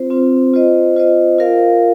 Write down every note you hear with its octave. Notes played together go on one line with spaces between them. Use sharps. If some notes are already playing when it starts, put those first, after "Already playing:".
Already playing: C4 F4 C5
C4 F4 C5
F4 C5 D#5
F4 C5 D#5
F4 A#4 F5